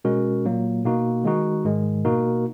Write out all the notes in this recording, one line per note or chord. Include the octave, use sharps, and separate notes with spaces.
B2 G#3 C#4 F#4 A#4
A#2 F#3 A#3
B2 A#3 D#4 F#4
D#3 G#3 D#4 F#4
G#2 D#3 G#3
B2 A#3 D#4 F#4 A#4